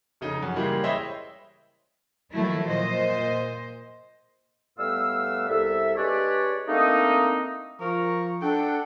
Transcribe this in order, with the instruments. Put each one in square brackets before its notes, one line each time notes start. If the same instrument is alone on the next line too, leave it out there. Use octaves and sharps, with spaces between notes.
[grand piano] F1 C#3 D#4
F#2 F#5
C#3 E3 G3 G#3 A#3
C5 C#5 D#5 E5 G5 B5
[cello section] D#3 F3 F#3 A3 E4
A#2 C5 D#5
[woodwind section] A2 G3 B3 B4 F5 E6
C2 A4 E5
G#3 D4 G4 B4 C#5 D5
A3 A#3 C4 D4 D#4
[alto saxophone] F3 [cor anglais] A#4 [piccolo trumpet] C#6
[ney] D4 [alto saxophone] A4 [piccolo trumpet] F#5 [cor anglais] G5